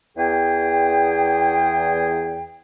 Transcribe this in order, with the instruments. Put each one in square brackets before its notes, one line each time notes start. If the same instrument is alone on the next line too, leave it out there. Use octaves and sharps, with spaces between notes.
[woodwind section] E2 G#4 G5